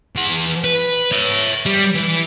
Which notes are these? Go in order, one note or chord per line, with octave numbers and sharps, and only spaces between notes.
E3 F#5
B4
C#5 E5
G3
E3